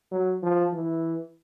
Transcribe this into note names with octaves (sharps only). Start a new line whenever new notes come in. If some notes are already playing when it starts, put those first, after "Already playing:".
F#3
F3
E3